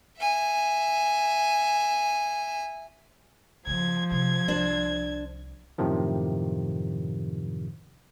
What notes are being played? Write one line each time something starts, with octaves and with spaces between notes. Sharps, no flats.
E5 G#5
C#3 F3 A#3 G#6
C3 G#6
C2 D4 C5
F#2 A2 C3 D#3 F3